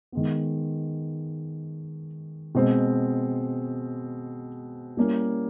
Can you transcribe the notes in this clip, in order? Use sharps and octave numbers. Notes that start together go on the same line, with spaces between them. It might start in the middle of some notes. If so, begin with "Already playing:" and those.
D#3 G#3 B3
B2 G#3 C4
G3 A#3 C#4 E4